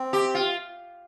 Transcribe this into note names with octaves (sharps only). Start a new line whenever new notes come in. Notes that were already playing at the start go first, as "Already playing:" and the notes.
Already playing: C4
G4
F4